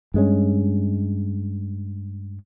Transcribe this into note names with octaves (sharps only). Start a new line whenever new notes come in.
G2 G#3 C#4